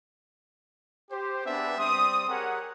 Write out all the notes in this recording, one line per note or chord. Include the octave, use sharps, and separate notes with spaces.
G4 C5
B3 C4 D4 G#4 B4 E5
G3 C4 C6 D#6
G4 G#4 A#4 C#5 F#5